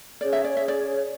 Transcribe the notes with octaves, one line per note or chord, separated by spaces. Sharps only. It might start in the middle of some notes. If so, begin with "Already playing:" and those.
C#4 G#4 C#5 D5
E5
D5
E5
D5